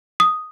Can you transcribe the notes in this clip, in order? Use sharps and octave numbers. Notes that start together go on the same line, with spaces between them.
D#6